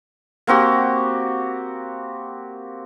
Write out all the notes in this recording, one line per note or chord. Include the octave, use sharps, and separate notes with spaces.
A#3 C4 F#4 G4